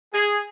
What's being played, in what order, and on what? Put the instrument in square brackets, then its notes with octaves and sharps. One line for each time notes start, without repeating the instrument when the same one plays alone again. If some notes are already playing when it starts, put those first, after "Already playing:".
[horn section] G#4